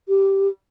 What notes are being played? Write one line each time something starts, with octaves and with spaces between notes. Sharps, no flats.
G4